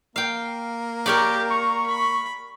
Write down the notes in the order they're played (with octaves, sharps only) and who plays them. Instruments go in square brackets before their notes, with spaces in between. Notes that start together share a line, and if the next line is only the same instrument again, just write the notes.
[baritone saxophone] A#3 [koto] F5 G5
[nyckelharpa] G4 [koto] A#4 C#5 D5
[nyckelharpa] A#5 [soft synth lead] C#6
[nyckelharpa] B5